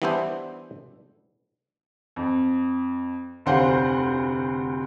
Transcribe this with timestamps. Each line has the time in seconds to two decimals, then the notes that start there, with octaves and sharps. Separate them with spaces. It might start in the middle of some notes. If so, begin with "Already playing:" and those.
0.02 E3 G3 B3 D4 E4 C5
2.16 F2
3.46 F1 D2 C5 F5 F#5